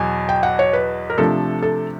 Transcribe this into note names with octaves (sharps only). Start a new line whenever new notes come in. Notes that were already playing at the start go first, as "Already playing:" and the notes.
Already playing: E2 B2 F#3 G#5
G5
F#5
C#5
B4
A#4
C3 F3 A3 D4 A4
A4